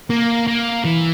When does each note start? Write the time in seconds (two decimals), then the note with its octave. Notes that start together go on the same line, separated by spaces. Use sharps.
0.10 A#3
0.48 A#3
0.85 E3